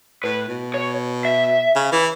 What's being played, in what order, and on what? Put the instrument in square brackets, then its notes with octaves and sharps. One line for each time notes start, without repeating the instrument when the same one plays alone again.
[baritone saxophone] A2 [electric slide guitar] B4
[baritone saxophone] B2
[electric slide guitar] C#5
E5
[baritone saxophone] C#3
E3